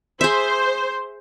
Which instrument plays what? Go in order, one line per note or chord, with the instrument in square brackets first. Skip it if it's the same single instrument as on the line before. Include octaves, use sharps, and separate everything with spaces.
[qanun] G#4 E5 [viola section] C5